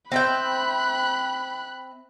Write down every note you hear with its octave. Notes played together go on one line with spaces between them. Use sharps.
C4 E5 G5 B5 F#6